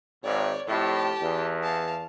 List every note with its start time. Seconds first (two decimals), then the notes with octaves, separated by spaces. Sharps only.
0.24 G#1 C#5 D5
0.68 F2 A2 G4 A5
1.21 E2
1.63 F5 A5